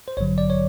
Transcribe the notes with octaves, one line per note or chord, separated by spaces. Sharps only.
C5
A1 G2 D3 F#3 C#5
D5
C#5